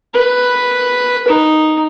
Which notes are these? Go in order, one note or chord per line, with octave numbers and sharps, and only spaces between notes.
B4
D#4